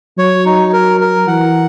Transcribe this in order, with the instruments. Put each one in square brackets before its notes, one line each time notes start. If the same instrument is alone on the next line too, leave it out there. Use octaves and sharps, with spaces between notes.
[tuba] F#3 [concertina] C#5
[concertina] D#4
A#4
A#4
[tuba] E3 [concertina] F#5